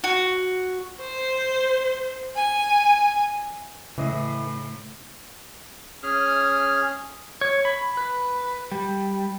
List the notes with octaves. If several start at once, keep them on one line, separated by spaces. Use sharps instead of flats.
F#4
C5
G#5
A2 C#3 E3 D#5
C#4 G#4 F6
C#5
B5
B4
G3